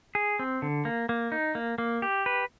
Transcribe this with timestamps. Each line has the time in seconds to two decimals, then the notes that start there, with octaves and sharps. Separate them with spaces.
0.15 G#4
0.39 C4
0.62 D3
0.85 A#3
1.09 A#3
1.32 D#4
1.55 A#3
1.78 A#3
2.02 G4
2.26 B4